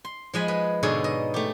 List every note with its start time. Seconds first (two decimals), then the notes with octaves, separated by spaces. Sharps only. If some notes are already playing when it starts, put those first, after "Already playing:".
0.05 C6
0.34 F3 G#3 G#5 B5
0.48 B4 D#5
0.83 G#2 B2 D3 D#4 G#4 C#5
1.04 D#5
1.34 A3 G4